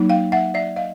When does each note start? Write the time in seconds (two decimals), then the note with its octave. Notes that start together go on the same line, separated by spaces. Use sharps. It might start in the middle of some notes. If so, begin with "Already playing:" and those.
Already playing: F#3 A#3 D#4
0.10 F5 G5
0.32 E5 F#5
0.54 D5 E5
0.76 D#5 F5